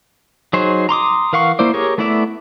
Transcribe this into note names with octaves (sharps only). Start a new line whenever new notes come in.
F#3 D#4 G#4 C5
A#5 C6 D6 D#6
E3 A#4 F5 F#5 C#6
A#3 E4 C5 D5
G4 G#4 A#4 C#5
A3 B3 E4 D5 E5